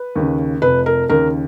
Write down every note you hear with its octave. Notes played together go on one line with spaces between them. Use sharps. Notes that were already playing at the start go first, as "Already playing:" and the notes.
Already playing: B4
D#2 C#3
F1 B4
A#4
D#2 C#3 A#4